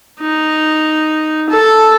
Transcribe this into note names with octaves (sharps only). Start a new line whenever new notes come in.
D#4
A4